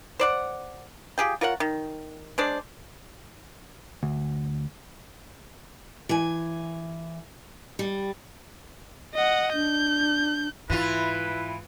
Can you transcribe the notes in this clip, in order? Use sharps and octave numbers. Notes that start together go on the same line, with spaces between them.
C5 D5 F#5
F4 G4 G#4 G5
F4 A#4 C#5 F#5
D#3
G#3 D4 C5 D5
D2
E3 G#5
G3
D#5 F#5
D4 G6
G#2 E3 E4 F4 B4